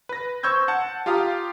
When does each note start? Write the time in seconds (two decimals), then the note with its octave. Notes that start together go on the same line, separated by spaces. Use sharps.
0.09 B4 A#6
0.43 C5 C#6 E6 G6 G#6
0.68 F#5 A5
1.06 F4 G4 F5 A#5 D#6